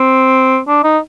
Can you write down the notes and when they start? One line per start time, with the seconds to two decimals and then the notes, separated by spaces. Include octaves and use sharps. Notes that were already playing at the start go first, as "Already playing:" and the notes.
Already playing: C4
0.68 D4
0.84 D#4